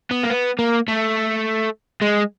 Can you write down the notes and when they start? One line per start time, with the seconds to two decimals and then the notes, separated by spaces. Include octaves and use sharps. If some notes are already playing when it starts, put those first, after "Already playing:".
0.11 B3
0.23 A#3
0.30 B3
0.59 A#3
0.88 A3
2.02 G#3